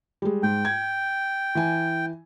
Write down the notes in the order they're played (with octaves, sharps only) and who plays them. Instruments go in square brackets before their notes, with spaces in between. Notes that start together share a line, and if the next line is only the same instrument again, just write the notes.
[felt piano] G3 G#3
[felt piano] G#2 [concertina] G5
[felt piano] G#6
E3 G#5